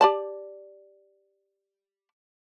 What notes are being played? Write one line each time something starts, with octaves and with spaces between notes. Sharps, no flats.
G4 D5 A5